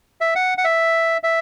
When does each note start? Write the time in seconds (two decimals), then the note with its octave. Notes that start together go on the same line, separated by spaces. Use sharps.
0.21 E5
0.36 F#5
0.58 F#5
0.64 E5
1.24 E5